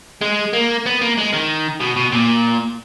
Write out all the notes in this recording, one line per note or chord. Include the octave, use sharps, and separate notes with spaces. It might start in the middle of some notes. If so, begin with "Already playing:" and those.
G#3
A#3
B3
A#3
G#3
D#3
B2
B2
A#2